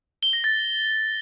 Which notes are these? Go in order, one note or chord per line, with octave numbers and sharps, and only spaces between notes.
G7
A#6
A6